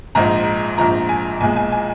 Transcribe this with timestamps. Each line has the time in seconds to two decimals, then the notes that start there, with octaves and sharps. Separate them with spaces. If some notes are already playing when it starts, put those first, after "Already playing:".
0.15 A#1 G#2 F3 A#5
0.78 A#1 G#2 F3 A#5
1.09 G#5
1.41 B1 A#2 G#3 G#5
1.56 G#5
1.72 G#5